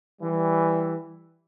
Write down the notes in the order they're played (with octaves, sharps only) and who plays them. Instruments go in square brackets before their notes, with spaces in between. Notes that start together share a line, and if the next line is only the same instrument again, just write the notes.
[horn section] E3 G3